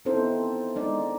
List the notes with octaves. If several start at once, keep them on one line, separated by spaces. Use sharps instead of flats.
B3 C4 D#4 E4 A4 C5
G#3 D#4 D5